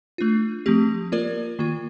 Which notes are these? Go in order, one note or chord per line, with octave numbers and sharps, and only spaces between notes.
A3 D4 F4
F3 A3 C4 G4
A#3 F4 A#4 D5
D#3 A#3 F4